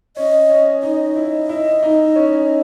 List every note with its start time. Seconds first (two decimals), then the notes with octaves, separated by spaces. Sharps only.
0.17 C#4 D#5
0.49 C#4
0.83 D#4 D#5
1.16 E4
1.49 E4
1.83 D#4
2.16 C#4